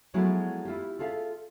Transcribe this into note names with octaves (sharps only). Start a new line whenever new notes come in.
F3 F#3 G#3 A3 B3 E4
E4 F4 G4
F4 G#4 A4 E5 F5